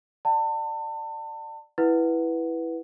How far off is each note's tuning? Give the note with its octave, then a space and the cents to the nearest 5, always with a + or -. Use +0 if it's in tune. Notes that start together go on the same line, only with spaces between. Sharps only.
D5 +15 F#5 +20 A5 +35
E4 +0 B4 -5 F#5 +0